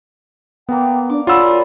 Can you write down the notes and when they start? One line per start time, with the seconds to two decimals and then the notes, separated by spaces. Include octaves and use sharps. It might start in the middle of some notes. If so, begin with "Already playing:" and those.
0.69 A#3 B3 A#4 F5 G5
1.10 D4 D5 D6
1.27 F#3 F4 F#4 G#4 B5 E6